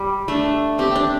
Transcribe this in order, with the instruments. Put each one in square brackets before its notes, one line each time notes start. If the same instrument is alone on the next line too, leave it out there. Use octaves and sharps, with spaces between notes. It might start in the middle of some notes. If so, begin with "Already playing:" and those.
Already playing: [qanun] G3
[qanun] A3 [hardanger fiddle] D4
[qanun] C4 [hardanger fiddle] G4
[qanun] D4